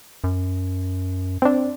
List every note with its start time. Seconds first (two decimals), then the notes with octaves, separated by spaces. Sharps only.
0.24 F#2
1.42 C4 D4